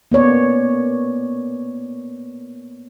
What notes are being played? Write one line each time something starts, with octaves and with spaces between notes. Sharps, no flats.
A#3 B3 C#5 D5